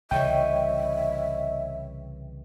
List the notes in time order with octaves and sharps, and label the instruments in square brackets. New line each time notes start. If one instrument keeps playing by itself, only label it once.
[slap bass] C2 C#3 E3 [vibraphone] C#5 D#5 C#6 [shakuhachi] E5 [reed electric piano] G5